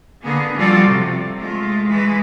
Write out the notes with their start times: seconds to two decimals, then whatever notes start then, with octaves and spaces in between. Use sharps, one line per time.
0.23 D3 A#3 B3 G#4
0.56 F3 G3 F4 F#4 A4 D5
0.87 C3
1.38 G#3 A3 F4
1.89 E3 G#3 B4